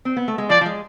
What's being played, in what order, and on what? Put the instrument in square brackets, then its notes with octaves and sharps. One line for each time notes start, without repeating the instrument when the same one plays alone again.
[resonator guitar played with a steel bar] C4
B3
A3
G#3
[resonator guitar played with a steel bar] F3 [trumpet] D5
[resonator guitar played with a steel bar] F3
G#3